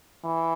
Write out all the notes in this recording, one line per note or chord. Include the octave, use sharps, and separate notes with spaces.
E3